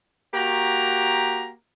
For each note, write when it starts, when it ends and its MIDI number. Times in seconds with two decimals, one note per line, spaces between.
0.33 1.50 58
0.33 1.50 66
0.33 1.50 67
0.33 1.50 82